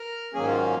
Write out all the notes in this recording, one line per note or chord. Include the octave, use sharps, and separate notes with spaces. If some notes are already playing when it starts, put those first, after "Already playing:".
Already playing: A#4
G#2 D#3 F#3 A#3 C#4 G#4
F4